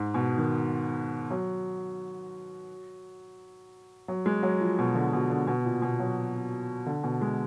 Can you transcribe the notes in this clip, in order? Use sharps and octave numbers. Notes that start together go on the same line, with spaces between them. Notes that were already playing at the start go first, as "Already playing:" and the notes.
Already playing: G#2
B2
D#3
F#3
F#3
G#3
F#3
F3
B2
D3
B2
D3
B2
A#2
B2
F#3
D3
B2
G#3